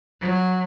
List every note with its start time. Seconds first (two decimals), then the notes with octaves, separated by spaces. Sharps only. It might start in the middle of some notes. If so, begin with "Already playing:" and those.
0.21 F#3